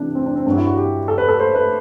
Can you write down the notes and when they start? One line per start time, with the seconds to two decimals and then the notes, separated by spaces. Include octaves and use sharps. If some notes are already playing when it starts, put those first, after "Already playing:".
Already playing: C3 E3 D4
0.15 C4
0.26 D4
0.36 C4
0.46 G2 D4
0.50 F#3
0.56 E4
0.67 F#4
0.77 G4
1.08 A4
1.18 B4
1.28 A4
1.40 C5
1.55 B4